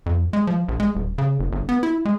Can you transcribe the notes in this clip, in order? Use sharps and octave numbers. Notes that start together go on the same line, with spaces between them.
F2
G#3
F3
A#1
G#3
D#1
C#3
F#1
G1
B3
E4
G#3